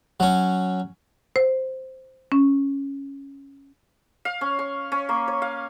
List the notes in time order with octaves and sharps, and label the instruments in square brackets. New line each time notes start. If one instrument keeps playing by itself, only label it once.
[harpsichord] F#3 C#4
[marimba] C5
C#4
[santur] F5
C#4
C#6
C#4
A#3
C#5
F5